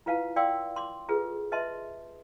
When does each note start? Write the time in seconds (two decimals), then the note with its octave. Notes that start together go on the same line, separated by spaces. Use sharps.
0.06 E4 F4 B4 F5 F#5 A5
0.36 D5 F5 G5 C6 D6 E6
0.76 C6 D6
1.09 F4 G#4 A4 B4
1.52 B4 D#5 E5 A5 C6